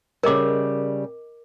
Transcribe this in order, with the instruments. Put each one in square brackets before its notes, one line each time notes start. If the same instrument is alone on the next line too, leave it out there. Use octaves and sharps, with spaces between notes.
[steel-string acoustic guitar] C#3 G3 [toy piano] A#4 D#5 D6